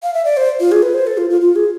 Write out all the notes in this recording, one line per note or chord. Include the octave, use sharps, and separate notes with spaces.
F5
E5
D5
C5
F4
G#4
B4
C5
A4
F4
F4
F4
G#4